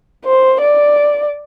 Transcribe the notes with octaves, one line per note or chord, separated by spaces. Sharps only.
C5
D5